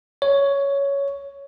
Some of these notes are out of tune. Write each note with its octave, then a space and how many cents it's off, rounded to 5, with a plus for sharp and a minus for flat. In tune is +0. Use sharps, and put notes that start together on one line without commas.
C#5 +10